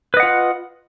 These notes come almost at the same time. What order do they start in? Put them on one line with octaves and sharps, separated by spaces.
B4 D#5 F#5 F4